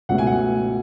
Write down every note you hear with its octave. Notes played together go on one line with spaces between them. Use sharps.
C#2 B2 F#3 A3 F#5
G#5
F#5